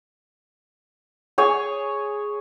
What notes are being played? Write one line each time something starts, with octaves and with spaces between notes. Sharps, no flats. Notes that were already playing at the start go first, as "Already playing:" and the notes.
G#4 C#5 G#5 C#6